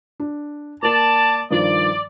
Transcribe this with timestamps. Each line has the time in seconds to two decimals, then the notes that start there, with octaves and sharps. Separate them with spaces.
0.20 D4
0.83 A#3 A#4 D5 A5
1.51 G2 D#3 F3 D5